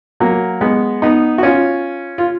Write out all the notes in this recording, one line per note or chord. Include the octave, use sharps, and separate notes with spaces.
F#3 A#3
G#3 B3
B3 D#4
F#4
C#4 F4
F4